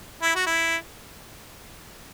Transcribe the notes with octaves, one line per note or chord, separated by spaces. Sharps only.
E4
F#4
E4